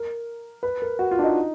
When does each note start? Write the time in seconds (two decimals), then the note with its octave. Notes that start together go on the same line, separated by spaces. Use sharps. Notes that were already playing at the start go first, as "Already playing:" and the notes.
Already playing: A#4
0.63 B4
0.82 A#4
0.99 F#4
1.11 F4
1.19 D4
1.24 D#4